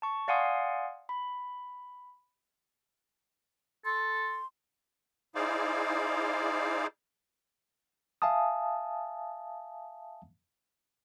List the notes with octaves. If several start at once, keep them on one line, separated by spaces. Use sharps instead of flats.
A5 C#6
D5 F5 F#5 G#5 C6 D#6
B5
A4 C6
D#4 E4 G#4 C5 D5 F5
E5 F5 G#5 A5 D#6